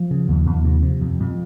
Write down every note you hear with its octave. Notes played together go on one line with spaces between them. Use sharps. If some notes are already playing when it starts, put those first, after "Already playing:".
Already playing: F3
C#3
D#2
D#2
C3
C3
F2
F2